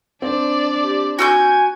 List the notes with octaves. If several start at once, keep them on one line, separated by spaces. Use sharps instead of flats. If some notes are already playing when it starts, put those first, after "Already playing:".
C4 D4 D5
G4
F#4 G#5 E6 G6 G#6